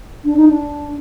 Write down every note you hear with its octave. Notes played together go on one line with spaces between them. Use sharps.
D4
D#4
D4